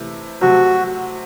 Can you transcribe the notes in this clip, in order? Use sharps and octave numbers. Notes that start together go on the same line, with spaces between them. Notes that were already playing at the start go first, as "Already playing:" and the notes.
Already playing: C3 E3 A3 E4
C3 F#3 A3 F#4